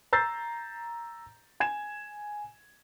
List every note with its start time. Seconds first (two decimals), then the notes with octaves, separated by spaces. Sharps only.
0.13 A#5 E6 G6 A6 C7
1.60 G#5 G#6 E7